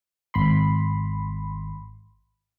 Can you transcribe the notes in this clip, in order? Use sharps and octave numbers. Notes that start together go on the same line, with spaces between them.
G#1 B5 C6